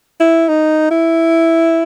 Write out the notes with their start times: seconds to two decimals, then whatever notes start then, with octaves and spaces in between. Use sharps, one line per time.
0.20 E4
0.48 D#4
0.91 E4